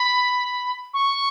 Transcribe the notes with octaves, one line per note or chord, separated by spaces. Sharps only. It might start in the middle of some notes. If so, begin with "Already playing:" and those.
Already playing: B5
C#6